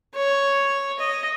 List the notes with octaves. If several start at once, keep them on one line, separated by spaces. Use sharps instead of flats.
C#5
D#5